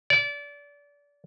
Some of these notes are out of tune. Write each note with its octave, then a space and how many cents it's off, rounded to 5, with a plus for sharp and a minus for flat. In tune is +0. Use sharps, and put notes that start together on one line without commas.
D5 -30